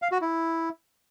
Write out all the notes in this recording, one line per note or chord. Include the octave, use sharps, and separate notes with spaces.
F5
F#4
E4